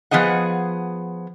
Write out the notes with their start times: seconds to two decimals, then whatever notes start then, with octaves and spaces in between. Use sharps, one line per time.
0.11 F3 B3 G#4 D#5 F#5